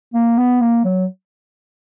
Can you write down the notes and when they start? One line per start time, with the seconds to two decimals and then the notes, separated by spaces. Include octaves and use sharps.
0.14 A#3
0.37 B3
0.61 A#3
0.84 F#3